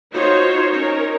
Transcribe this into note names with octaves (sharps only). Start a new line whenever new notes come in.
D#4 F4 F#4 C5 C#5
C#4 D#4 A#4 C#5